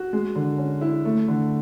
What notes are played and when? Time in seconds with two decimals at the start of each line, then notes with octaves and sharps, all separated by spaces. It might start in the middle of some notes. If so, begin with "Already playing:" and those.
Already playing: F#4
0.13 G#3
0.35 D3
0.58 C#4
0.81 E4
1.05 A3
1.28 D3